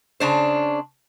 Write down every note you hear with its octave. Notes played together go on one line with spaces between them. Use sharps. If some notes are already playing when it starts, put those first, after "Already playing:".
C#3 D4 C5